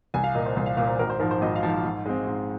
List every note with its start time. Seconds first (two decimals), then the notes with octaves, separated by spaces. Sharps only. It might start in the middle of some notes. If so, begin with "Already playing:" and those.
0.14 C2 G#5
0.24 F5
0.35 A#2 A#3 D#5
0.46 C5
0.56 C2 C5
0.66 F5
0.77 A#2 A#3 F5
0.88 C5
0.99 G#1 A#4
1.10 C5
1.20 G#2 F3 A#4
1.31 C5
1.41 G#1 D#5
1.56 F5
1.63 G#2 F3
1.69 F5
1.84 G#2
2.06 G#3 C4
2.27 G#2